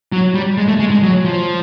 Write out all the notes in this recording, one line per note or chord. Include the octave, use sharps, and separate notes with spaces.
F#3
G3
G#3
A3
G#3
G#3
F#3
F3